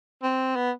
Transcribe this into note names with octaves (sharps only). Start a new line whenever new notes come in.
C4
B3